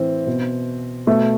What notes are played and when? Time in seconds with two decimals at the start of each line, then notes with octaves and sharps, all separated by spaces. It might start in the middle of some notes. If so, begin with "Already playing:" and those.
Already playing: A2 E3 C4
0.27 B2
1.07 B2 A3